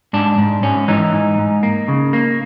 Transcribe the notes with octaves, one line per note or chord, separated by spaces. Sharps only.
G#2 D4
G#2
G#2 C#4
E3 D#4
G#2
G#2
A#3
C#3
A#3